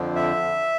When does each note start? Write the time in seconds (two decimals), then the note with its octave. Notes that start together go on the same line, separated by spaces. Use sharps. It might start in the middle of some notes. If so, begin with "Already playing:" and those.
Already playing: F2 D3 F3
0.16 E5